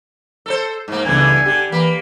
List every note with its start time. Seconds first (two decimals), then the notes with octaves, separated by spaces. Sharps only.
0.46 A4 A#4 C5
0.88 G#2 A#3
1.05 C#2 G2 D3 E3 B3 G#5
1.46 D3 G4
1.72 E3 A#3 B5